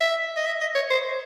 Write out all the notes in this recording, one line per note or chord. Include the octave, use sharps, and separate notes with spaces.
E5
D#5
E5
D#5
C#5
C5